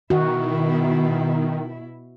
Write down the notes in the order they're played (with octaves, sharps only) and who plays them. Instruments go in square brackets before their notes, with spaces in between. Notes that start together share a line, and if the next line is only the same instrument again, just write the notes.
[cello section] B2 E4 [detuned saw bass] D#3 [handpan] F#4